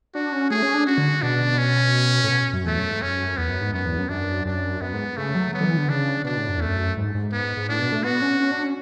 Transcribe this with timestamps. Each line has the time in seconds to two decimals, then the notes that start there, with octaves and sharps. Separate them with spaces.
0.15 D4 F#4
0.33 C#4
0.50 A3 G#4
0.63 C#4
0.74 D4
0.86 C#4 F#4
0.98 D3
1.22 B2 D4
1.58 C#4
2.24 A2
2.29 B2
2.53 F#2
2.65 E2 A3
2.78 F#2
2.90 G#2
3.02 F#2 C#4
3.37 E2 B3
3.50 F#2
3.61 G#2
3.73 F#2 B3
3.86 E2
3.98 F#2
4.09 F#2 D4
4.45 F#2 D4
4.81 F#2 B3
4.93 G#2
5.17 C#3 A3
5.35 F#3
5.53 F#3 B3
5.60 D3
5.64 E3
5.77 D3
5.88 C#3 D4
6.24 B2 D4
6.37 A2
6.49 F#2
6.57 E2 A3
6.67 F#2
6.97 G#2
7.15 G#2
7.33 B3
7.57 G#2
7.68 A2 D4
7.80 B2
7.92 A3
8.04 B3 F#4
8.22 C#4
8.40 C#4
8.51 D4
8.64 C#4